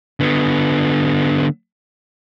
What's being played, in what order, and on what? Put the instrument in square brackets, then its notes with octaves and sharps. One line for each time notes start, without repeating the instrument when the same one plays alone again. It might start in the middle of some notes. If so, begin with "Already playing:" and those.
[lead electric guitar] D3 B3